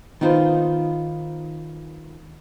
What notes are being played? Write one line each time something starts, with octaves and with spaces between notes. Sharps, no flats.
D#3 B3 D#4 F4 C5